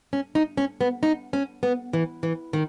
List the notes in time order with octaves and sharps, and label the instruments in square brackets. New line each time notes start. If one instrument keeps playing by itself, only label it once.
[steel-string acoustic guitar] C#4
D#4
C#4
B3
D#4
C#4
B3
E3
E3
D#3